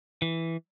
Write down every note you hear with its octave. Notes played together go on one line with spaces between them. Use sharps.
E3